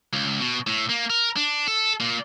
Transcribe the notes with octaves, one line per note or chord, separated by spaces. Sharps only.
C#2
B2
A2
A#3
A#4
D4
A4
A#2